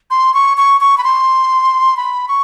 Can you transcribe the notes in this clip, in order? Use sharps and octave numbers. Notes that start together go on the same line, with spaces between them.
C6
C#6
C#6
C#6
B5
C6
B5
C#6